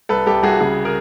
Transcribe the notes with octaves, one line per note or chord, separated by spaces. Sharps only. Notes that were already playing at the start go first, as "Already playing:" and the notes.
C2 A4 B4
C2 G4 A4
C2 F#4 G#4
C#3 F#4 G#4
G#4 A#4